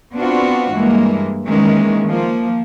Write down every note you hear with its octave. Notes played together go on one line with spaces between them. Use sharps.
B3 C4 D4 F4 F#4
G2 E3 G#3 A#3
D#3 E3 G#3 A#3 C#4
F3 A#3